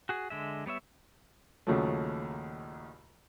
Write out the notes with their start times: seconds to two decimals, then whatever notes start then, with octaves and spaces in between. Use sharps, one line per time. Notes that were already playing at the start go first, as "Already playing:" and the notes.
0.09 F#4 G#4
0.30 D3 G#3 E5
0.66 G3 B3 C#5 E5
1.67 A#1 D#2 C#3 F3 F#3 A3